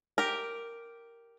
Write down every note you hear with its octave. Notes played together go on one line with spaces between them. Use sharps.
G4 A#4